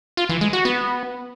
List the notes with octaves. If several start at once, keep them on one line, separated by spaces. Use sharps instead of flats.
F4
E3
G#3
F#4
B3